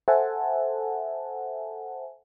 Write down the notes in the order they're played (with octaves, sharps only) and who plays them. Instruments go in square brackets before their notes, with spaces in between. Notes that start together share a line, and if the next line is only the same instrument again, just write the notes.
[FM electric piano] A4 C5 E5 F#5 G#5 A5